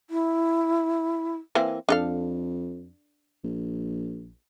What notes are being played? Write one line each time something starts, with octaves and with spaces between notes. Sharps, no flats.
E4
E3 A#3 C4
F2 D4 A4 F5
A#1